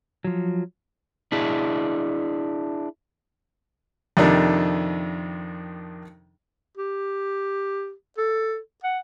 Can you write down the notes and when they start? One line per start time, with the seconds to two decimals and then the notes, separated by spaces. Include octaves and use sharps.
0.24 F3 F#3
1.32 D4 E4 G#4
4.17 F2 C3 D#3 D4 D#4
6.77 G4
8.18 A4
8.84 F#5